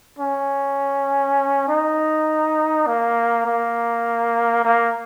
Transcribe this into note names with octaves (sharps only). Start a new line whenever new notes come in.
C#4
D#4
A#3
A#3
A#3